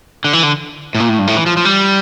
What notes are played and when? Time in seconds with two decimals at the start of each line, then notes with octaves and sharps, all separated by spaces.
0.25 D3
0.33 E3
0.43 D3
0.95 A2
1.00 A#2
1.09 A2
1.19 G2
1.27 A2
1.37 E3
1.46 F3
1.57 F3
1.65 G3